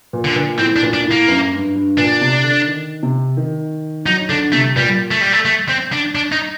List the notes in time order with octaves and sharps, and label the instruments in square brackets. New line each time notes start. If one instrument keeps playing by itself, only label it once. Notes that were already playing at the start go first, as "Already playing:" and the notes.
[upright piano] A#2
[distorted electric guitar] D3
[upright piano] A#2
[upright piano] A2 [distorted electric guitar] C4
[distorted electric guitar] D4
[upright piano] A#2
[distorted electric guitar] D4
[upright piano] A2
[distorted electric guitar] A#3
[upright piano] F#2
G2
G2
[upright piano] A#2 [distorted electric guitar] D4
[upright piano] C3
D3
D#3
C3
D#3
[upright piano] F#3 [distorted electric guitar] D#4
[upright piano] D3 [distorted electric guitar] D4
[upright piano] C3 [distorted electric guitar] A3
[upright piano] A#2 [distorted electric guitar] G3
[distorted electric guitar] A3
G3
A3
A3
C4
D4
D4
D#4